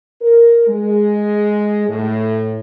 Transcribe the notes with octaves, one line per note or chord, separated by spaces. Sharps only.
A#4
G#3
A2